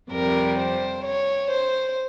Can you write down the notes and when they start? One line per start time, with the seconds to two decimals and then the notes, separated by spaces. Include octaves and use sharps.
0.12 F2 C3 G3 A#4
0.58 C5
1.04 C#5
1.50 C5